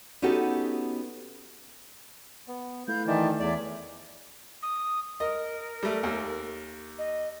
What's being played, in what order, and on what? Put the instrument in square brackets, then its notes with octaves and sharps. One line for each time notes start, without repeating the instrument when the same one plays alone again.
[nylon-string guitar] B3 C#4 D#4 F#4 G4 A4
[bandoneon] B3
[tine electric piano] A3 E4 A4 [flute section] F5 B5 G6
[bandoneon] D#3 E3 [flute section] D5 E5 A5
[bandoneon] E2 D5 [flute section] G#4 C#5 E5
[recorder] D#6
[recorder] A#4 [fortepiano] D#5
[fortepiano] G3 A3
D#2
[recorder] D#5